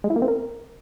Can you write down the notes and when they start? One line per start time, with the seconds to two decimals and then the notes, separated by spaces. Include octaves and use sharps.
0.04 G#3
0.10 E4
0.16 A#3
0.22 C4
0.28 A#4